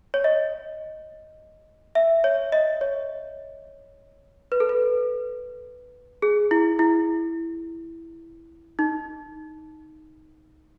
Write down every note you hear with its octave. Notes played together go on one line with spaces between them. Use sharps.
C#5
D#5
E5
C#5
D#5
C#5
B4
A4
B4
G#4
E4
E4
D#4